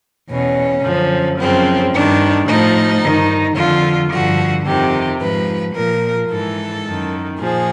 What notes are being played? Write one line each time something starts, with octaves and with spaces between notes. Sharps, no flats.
E2 B2 C#4
F#2 D3 F3
F#2 C#3 F3 C4
G2 D#3 D4
A2 F3 D#4
G2 D#3
F2 D3 F3 F4
G2 D3 F3 F#4
F2 C3 D#3 G4
G#2 F3 B4
A#2 F3 A#4
G#2 E3 A4
F#2 D#3
A#2 F3 G#4